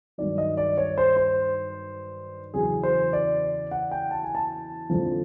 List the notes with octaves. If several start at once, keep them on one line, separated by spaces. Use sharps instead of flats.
G2 D#3 F#3 D5
D#5
D5
C#5
C5
C5
E2 C#3 F#3 G#4
C5
D5
F#5
G5
A5
G#5
A5
F2 D3 F3